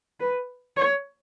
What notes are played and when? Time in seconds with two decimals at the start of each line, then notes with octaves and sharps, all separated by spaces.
0.20 B4
0.77 C#5